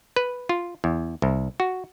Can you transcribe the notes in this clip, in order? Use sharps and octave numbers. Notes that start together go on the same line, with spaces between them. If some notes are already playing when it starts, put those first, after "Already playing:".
B4
F4
E2
C2
F#4